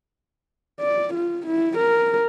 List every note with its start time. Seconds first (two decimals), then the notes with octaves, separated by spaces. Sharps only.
0.80 D5
1.14 F4
1.47 E4
1.78 A#4